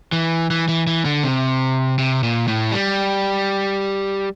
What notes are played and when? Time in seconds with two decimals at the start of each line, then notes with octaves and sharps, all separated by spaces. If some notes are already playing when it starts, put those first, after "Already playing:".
0.12 E3
0.51 E3
0.68 E3
0.87 E3
1.05 D3
1.24 C3
1.98 C3
2.23 A#2
2.48 A2
2.72 G3